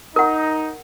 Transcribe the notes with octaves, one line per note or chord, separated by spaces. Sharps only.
D#4 A#4 F#5